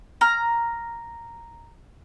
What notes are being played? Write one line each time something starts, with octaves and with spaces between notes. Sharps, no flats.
A#5 F6